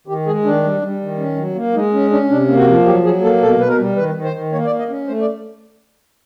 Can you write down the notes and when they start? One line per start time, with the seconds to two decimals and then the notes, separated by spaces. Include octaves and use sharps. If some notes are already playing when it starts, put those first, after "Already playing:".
0.07 D#3 G4
0.26 G#3 G#4
0.44 D#3 D4
0.63 G3
0.81 G3
1.01 D#3
1.18 C#4
1.37 F#3
1.55 A#3
1.74 G#3 D#4
1.93 C#4
2.11 C#4 D4
2.29 C3 D4
2.48 A#3
2.57 F#4
2.66 F3
2.85 F#3 G4
3.03 F#3 G#4
3.22 A#3 A4
3.41 B2 A4
3.59 B2 B4
3.68 A#4
3.78 G3
3.96 D#3 B4
4.14 D#3
4.24 C5
4.33 D#3
4.52 A#3 C#5
4.66 D5
4.70 A#3
4.79 D#5
4.89 C#4
5.08 A3 C5
5.21 D5